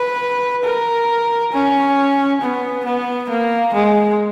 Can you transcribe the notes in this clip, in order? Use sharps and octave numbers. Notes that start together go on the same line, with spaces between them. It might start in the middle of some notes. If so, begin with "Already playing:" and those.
Already playing: B4
A#4
C#4
B3
B3
A#3
G#3